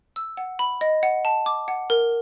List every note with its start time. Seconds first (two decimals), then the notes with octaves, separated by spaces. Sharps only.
0.16 E6
0.37 F#5
0.59 B5
0.81 D#5
1.03 F#5
1.25 A5
1.46 D6
1.68 F#5
1.90 A#4